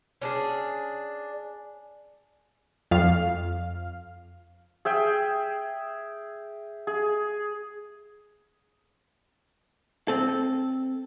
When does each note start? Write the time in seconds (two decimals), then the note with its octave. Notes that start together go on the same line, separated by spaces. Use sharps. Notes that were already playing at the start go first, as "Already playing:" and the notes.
0.21 C#4 D4 G#4
2.91 F2 F5
4.85 G#4 E5 G5
6.87 G#4
10.08 C4 A4